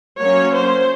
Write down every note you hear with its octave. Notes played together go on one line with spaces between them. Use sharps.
F#3 A#3 C#4 C#5
C5